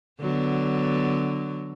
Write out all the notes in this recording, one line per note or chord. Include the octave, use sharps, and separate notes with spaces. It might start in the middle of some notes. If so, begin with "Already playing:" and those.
D3 F#3 B3